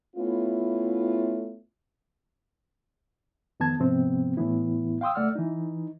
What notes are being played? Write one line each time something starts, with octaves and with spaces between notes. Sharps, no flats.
A3 B3 C#4 E4 F4
F2 D#3 B3 A5 G#6
C#2 G#2 C3 F3 B3 C4
A2 E3 B3 E4
F5 G5 C6 D#6 E6
C#2 A3 D5 F#5 E6 F6
E3 D#4